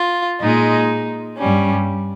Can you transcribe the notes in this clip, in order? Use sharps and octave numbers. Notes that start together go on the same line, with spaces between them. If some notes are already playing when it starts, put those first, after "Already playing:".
Already playing: F4
A#2 G#3 D#4
G2 G3 C#4